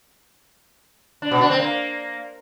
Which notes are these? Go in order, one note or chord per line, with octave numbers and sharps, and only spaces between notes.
D4
B2
D4
C4
A#3